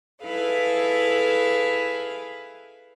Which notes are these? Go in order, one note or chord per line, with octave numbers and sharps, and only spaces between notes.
E4 G#4 A4 B4 F5